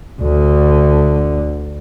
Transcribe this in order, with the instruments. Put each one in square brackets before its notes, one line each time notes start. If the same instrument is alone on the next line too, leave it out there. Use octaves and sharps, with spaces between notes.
[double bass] D2 D3